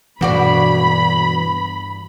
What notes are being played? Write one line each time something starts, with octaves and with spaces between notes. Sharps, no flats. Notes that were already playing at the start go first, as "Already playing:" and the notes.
G2 B2 E3 F#4 D5 B5